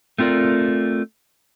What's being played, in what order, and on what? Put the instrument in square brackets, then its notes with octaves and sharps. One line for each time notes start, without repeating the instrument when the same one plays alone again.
[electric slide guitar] A3 C4 F4 A#4 D5